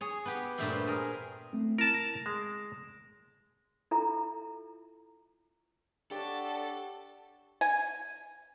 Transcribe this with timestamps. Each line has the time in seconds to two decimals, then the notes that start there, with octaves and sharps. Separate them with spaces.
0.01 G#4 C#5
0.25 B3 G4
0.58 G2 A#2 A3 C5 E5 B5
0.87 G#4 A#4
1.53 A3 C4
1.78 E4 A#4 A5
1.94 A#6
2.26 G#3
3.91 E4 F4 A4 E5 A#5
6.11 D4 G4 A4 C#5 F#5
7.61 G#5